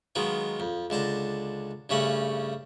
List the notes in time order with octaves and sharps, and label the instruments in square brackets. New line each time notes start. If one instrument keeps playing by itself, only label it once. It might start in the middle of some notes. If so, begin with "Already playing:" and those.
[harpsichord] D#3 F#3 G#3 B3 F4
F2
C#2 D3 A5 A#5
G2 C#3 A3 C#4 F#5